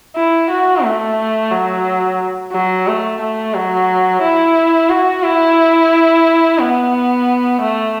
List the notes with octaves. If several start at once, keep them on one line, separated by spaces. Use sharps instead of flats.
E4
F#4
A3
F#3
F#3
A3
A3
F#3
E4
F#4
E4
B3
A3